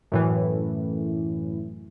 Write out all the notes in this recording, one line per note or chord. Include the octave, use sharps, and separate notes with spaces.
F#2 A2 E3